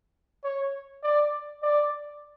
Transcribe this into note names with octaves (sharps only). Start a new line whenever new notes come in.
C#5
D5
D5